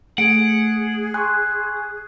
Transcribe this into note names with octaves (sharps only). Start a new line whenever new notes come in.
A3 G#4 F#5 D7
G#5 C6 C#6 F#6